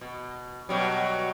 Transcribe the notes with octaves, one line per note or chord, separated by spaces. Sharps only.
B2
B2 F#3 G3